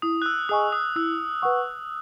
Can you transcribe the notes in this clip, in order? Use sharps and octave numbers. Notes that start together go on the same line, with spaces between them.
E4 D#6
F#6
E6
G#4 D#5 G#5 C#6 D#6
D#6
E4 E6
B4 F#5 C#6